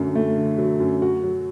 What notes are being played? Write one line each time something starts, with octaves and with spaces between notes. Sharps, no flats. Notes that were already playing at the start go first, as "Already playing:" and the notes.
Already playing: F#2 D3 F#3 A3
A3
D3
F#3
F#2
F#4
F#3